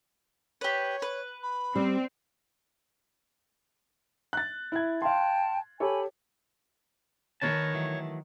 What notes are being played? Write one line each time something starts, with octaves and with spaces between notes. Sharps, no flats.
G4 B4 C#5
B4
B5
G3 C4
F#6 A6
E4 G#6
F5 G5 A5 C6
G4 A4 C#5 G#5 B5
D#3 A#4 B4 C#5 A5
E3 F#3 A3